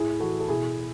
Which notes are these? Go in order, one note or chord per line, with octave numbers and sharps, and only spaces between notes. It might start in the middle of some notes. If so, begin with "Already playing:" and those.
Already playing: A2 E4 G#4
E3 F#4 A4
A4
B2 E4 G#4